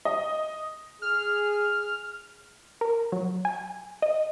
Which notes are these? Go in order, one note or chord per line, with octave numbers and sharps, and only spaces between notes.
D#5
G#4 F6
A#4
F#3
G#5
D#5